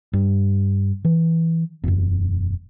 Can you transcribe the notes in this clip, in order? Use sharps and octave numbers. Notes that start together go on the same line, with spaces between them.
G2
E3
E1 F#2